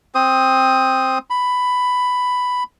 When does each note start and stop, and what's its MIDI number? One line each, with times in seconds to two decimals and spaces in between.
0.15 1.18 60
0.15 1.18 72
0.15 1.18 87
1.30 2.63 83